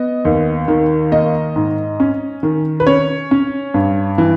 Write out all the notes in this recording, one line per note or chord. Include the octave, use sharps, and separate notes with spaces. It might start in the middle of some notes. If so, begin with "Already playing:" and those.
Already playing: B3 D#5
D#2
D#3
A#3 D#5
G#2
C#4
D#3
B4
C#4 C#5
C#4
G2
E3